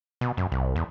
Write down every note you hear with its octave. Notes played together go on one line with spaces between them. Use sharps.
B2
F#2
C2
E2